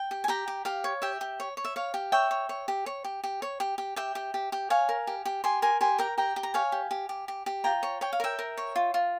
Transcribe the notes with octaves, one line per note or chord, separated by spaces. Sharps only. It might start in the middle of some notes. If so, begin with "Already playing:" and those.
Already playing: G5
G4
G#5
G4 G5 A#5
G4
G4 F5
C#5
G4 E5 G5
G4
C#5
C#5
E5
C#5 F5
G4
C#5 E5 G5
C#5
C#5
G4
C#5
G4
G4
C#5
G4
G4
G4 E5 G5
G4
G4
G4
C#5 F5 G#5
A#4
G4
G4
G4 G#5 C6
A#4 G#5 C6
G4 G#5 C6
A#4 G5 A#5
G4 G5 A#5
G4
A#5
C#5 F5 G#5
G4
G4
G4
G4
G4
F4 G5 A#5
C#5
C#5 G5
F5
A#4 E5 G5
A#4
C#5
F4
F4